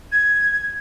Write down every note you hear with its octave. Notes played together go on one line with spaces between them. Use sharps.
G#6